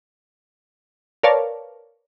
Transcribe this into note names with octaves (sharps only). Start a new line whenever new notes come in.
A#4 B4 C#5 D5 F5 A5